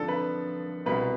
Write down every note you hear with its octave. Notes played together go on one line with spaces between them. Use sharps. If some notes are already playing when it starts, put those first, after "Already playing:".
Already playing: F2 D3 F3 D4 A4
B4
C2 B2 B4